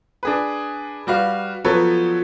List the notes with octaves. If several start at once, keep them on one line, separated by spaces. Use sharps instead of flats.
D4 G#4 B4
G3 F#4 B4 F5
F3 F#3 B3 A4 B4 C#5